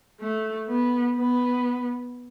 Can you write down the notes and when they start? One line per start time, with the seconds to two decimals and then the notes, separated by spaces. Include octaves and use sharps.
0.20 A3
0.68 B3
1.17 B3